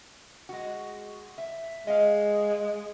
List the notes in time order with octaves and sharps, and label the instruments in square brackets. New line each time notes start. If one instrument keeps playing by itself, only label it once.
[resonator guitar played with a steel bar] G#3 F#4
E5
[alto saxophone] G#3 [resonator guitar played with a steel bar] D#5 F5